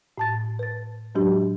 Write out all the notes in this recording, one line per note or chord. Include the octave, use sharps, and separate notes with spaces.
A2 A5 A6
B4 A6
A2 F#3 G#3 D4 F#4 G4